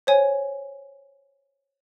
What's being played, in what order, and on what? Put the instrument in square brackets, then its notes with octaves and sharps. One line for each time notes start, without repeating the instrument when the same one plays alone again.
[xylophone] C5 C#5 G#5